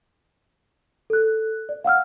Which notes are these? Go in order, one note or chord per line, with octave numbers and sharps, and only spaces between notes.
A4 F#6
D5
F5 F#5 E6 F6